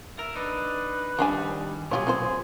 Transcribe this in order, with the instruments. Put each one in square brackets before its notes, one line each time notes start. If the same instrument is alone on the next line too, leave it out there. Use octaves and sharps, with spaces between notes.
[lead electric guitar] A#4 [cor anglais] E5
[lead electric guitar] D4 D#4 [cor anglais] B4
[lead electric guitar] D#3 G3 [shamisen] F3 D4 G#5
[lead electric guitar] B1 A#2 [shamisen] G3 F4 C#5 [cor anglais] G#4
[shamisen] C4 F4 C5